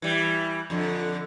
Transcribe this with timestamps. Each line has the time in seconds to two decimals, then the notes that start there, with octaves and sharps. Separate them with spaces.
0.02 E3 G3
0.70 F2 D3